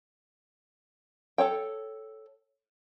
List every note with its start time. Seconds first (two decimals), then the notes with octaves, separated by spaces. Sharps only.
1.38 A4 C#5 G5